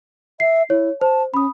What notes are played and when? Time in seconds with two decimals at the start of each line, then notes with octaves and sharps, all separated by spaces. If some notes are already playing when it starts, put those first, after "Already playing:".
0.40 E5 C7
0.70 E4 C#5
1.01 C5 A5
1.34 C#4 B5 D#6